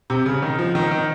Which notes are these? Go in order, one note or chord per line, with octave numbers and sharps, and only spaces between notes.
C3
C#3
D#3
F3
D#3
D#3